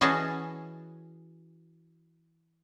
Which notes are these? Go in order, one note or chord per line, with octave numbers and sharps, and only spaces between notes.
E3 C#4 F#4 G#4 D#5 A5